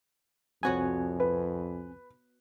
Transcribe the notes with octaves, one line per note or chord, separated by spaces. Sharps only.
C2 F2 B3 C4 F#4 C#5 G#5
B4